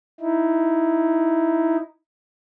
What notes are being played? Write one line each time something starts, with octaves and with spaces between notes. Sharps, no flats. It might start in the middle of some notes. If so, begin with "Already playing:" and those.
D#4 E4